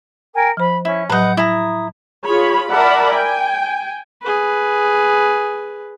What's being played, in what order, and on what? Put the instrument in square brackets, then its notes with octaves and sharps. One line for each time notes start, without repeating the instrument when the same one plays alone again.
[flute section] A#4 G5 G#5
[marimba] F3 C5 [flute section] B5
[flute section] C#4 [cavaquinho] E4
[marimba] A2 F#3 [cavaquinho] B4 D#5 [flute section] F#5 G6
[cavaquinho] E4 A#5 [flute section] D#6
[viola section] F4 G#4 C#5 B5
A#4 D5 E5 F#5 A5 B5
G5 G#5
[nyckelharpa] G#4 B4